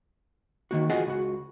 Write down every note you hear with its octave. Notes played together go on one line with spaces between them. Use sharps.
D#3 A#3 F#4
F4 F#4 G#4 D#5 F#5
C#2 F#4